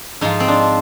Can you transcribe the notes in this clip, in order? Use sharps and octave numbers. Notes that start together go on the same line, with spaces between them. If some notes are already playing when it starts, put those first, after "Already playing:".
G#2 F3 D#4
C4
D4